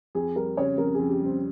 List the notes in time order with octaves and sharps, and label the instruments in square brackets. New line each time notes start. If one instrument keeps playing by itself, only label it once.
[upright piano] F2 [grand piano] G#4
[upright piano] G3 [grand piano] A#4
[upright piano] C#3 [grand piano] C#5
[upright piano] F2 [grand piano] A#4
[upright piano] F2 [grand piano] G#4
[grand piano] G4
[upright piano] G3 [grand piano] C4